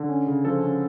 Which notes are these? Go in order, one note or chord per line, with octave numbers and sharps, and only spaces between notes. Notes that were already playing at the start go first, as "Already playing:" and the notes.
Already playing: D3
C#4
C#3
F3 A4
C#4